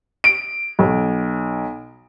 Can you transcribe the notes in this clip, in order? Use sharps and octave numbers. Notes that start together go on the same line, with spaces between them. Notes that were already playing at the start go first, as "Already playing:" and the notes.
D7
B1